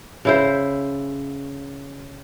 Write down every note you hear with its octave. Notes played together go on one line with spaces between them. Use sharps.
C#3 E4 C5